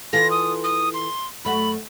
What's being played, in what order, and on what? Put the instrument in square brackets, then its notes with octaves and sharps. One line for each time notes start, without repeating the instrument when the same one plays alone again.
[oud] E3 F4 A4 [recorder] A#6
[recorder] D#6
D#6
C6
[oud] F#2 A3 F#4 [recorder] B5